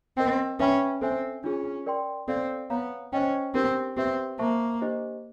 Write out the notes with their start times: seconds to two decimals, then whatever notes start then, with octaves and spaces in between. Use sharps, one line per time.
0.17 C4 A#4 D#5 G5
0.59 C#4 B4 E5 G5 B5
1.01 C4 A4 C5 E5 G#5
1.44 C#4 D4 F4 G#4
1.86 A#4 D5 G5 C6
2.28 C4 A4 D5 F5
2.70 B3 C#5 F5 A#5
3.13 C#4 C5 D#5 G5
3.55 C4 D4 G4 A#4
3.97 C4 G4 B4 E5
4.39 A#3 C5 E5 A5 C#6
4.82 D4 G4 C5 D#5